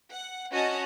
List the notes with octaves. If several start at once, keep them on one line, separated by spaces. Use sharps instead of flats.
F#5
C#4 F#4 D#5 F#5 A5